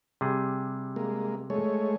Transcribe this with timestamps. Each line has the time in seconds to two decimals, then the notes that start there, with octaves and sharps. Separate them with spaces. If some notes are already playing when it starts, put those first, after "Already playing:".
0.21 C3 G3 G#4
0.96 G#3 A#3
1.50 G#3 A3 C#5